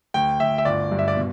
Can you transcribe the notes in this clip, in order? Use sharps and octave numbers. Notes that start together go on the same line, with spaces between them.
D2 G5
D2 E5
E5
G1 D5
G2
E5
D5
B2